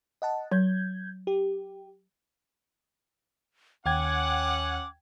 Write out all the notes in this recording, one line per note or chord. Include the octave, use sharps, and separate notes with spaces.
D#5 F#5 A5
F#3 G6 G#6
G4
D#2 C#4 F#5 G5 D6 G#6